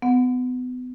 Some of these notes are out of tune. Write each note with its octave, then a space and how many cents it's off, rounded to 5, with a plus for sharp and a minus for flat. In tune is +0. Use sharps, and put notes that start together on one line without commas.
B3 +30 F#5 -20